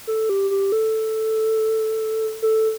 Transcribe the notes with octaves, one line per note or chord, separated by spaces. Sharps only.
A4
G4
G4
A4
A4